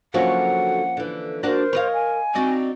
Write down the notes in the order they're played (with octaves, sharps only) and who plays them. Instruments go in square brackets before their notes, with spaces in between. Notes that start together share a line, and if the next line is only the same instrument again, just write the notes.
[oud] D3 F#3 F#4 [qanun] F3 A#3 C#4 [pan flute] F#5
[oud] D3 E3
[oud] A#3 D4 F#4 [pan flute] A#4 [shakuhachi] C5
[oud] B4 F5 [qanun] C#5 D#5
[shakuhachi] G#5
[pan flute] C4 [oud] D4 D#4 F#4